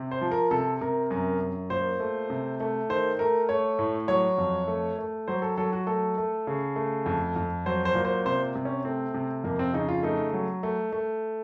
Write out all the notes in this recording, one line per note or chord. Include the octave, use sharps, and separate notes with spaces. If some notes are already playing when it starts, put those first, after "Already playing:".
Already playing: C3
C5
F3
A#4
C3 A4
C3 A#4
F#2 A#4
F#2
A#2 C5
A3
C3
A3
D#3 C5
A3 A#4
A3 C#5
A2
F#3 C#5
F2
A3
A3
F#3 C5
A4
F#3 A4
F#4
A3 A4
A3
C#3
A3
F2
F2
F#3 C5
C5
A#2
C5
C3 C5
C3
C#4
A3 C4
C3
F2 A#3
C4
C#3 D#4
F4
A3 D#4
F#3
A3
A3